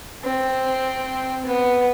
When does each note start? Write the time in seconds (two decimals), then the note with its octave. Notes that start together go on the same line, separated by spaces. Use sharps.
0.23 C4
1.46 B3